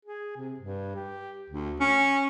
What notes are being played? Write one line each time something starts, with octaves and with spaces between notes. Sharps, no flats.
G#4
C3
G2
G4
D2
C#4